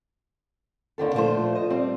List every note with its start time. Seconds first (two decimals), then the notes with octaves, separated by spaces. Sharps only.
0.98 D#2 D3 D#3 A4
1.14 A#2 D3 F3 A3 C5
1.55 D#5
1.70 G3 C4